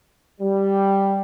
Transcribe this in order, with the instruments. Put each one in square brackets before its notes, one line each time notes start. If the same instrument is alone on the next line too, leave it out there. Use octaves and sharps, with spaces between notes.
[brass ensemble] G3